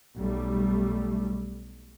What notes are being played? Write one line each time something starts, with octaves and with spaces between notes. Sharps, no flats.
B1 G3 A3